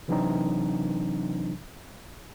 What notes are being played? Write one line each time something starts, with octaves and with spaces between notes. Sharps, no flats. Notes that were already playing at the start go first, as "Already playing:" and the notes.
C3 E3 F#3 C4 D4 D#4